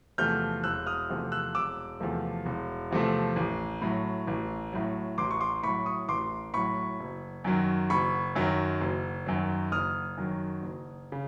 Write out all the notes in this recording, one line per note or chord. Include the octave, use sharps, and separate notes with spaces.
E2 C3 F3 A3 F6 G6
E1 E6 F#6
D#6 F6
E2 C3 F3 A3
E6 F#6
E1 D6 E6
E2 C3 F3 A3
E1
E2 C3 F3 A3
A1
A2 F#3
A1
A2 F#3
A1 C6 D6
C#6
C6 D6
A2 F#3 B5 C#6
C#6 D#6
A1 C6 D6
A2 F#3 B5 C#6
F#1
F#2 D#3 F#3
F#1 B5 C#6
F#2 D#3 F#3
F#1
F#2 D#3 F#3
F#1 D#6 F6
F#2 D#3 F#3
F#1
C#3